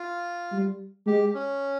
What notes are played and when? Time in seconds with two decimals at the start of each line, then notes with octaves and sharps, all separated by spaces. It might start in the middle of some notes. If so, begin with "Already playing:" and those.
Already playing: F4
0.52 G3
1.06 G#3 G4
1.34 C#4